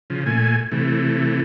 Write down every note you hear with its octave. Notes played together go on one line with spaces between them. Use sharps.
C#3 F3
A#2 A3 G#5
C3 E3 A3